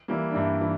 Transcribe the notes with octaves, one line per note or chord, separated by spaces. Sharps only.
E3 G3 A#3
D4
G2 E4
E3